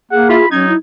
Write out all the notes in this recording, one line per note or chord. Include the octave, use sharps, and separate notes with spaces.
A#3 G#4 F#5
E4 F4 B5
F#3 C#4 D#4 G#6
E4